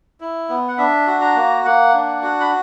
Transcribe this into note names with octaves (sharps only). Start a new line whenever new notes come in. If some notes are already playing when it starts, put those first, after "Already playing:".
E4
B3
F#5
D4 E5
F#4
A#5
A#3
A#3 F#5
D4
F#4
B5